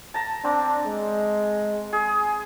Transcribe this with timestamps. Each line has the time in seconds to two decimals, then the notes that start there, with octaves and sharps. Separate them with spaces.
0.14 A5 A#5
0.44 C4 D4
0.86 G#3
1.93 G#4